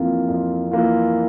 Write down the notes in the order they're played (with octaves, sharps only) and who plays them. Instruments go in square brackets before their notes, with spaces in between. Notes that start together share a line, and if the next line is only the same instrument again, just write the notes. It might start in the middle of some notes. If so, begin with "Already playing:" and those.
Already playing: [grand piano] F2 E3 A#3 F4 [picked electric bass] C4
[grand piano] F2
E3 A#3 F4